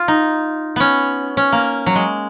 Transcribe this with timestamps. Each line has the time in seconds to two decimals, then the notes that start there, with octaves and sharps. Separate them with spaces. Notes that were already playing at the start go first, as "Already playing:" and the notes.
Already playing: F4
0.08 D#4
0.76 B3 C#4
1.37 C#4
1.52 A#3
1.86 F#3
1.95 G#3